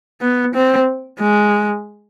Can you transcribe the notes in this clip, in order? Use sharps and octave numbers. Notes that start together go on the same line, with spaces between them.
B3
C4
G#3